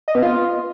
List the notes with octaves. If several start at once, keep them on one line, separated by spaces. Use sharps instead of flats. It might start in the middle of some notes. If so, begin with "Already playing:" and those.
D#5
B3
F4